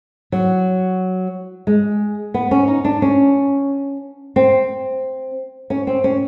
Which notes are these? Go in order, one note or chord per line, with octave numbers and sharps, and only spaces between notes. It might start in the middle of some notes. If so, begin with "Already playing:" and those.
F#3
G#3
B3
C#4
D#4
D4
C#4
C4
C#4
C4
C#4